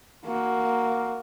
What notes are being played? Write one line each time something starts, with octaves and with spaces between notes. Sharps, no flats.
A#3 F#4